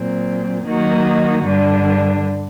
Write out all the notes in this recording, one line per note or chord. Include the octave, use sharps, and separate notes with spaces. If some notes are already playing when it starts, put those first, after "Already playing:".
Already playing: A#2 F#3 C4
D#3 F#3 A#3 D#4 F#4
G2 D3 G3 D4